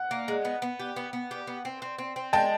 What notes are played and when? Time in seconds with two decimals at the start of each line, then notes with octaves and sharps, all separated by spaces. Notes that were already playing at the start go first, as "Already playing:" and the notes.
Already playing: F#5
0.11 A#3
0.28 G#3
0.45 B3
0.62 B3
0.79 G4
0.96 B3
1.13 B3
1.31 G4
1.47 B3
1.65 C4
1.82 C4
1.98 C4
2.16 C4
2.33 G#3 G5 A5